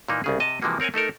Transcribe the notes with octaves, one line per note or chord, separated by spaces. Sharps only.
A#2 E3 A#3 D#4
C2 C#3 G#4
C3 D#5 A5
C3 E3 F3 G#3 A#3 F#4
C4 A#4 C#5 F#5 G#5
A3 D#4 A4 A#4